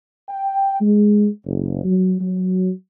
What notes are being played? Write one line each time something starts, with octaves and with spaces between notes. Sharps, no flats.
G5
G#3
F#1
F#3
F#3